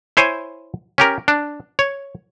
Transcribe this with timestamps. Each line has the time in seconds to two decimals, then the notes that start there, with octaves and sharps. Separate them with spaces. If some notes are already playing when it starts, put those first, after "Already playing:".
0.17 E4 C5 C#5 G#5
0.98 C#4 G4 A#4
1.28 D4
1.79 C#5